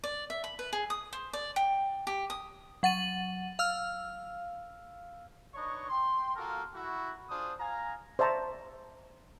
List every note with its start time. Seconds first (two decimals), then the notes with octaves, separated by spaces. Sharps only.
0.04 D5
0.30 E5
0.44 B5
0.59 B4
0.73 G#4
0.90 D#6
1.13 C5
1.33 D5
1.56 G5
2.07 G4
2.30 D#6
2.83 F#3 F#5 A6 D#7 F#7
3.59 F5 E6 F6
5.54 D4 D#4 B4 C#5 D#5 C#6
5.89 G5 C6
6.36 A#3 F4 F#4 A4 A#4
6.74 E4 F#4
7.30 D4 F4 G#4 C5 D#6
7.60 F5 G#5 A#5
8.19 C5 D5 E5 A5 A#5 C#6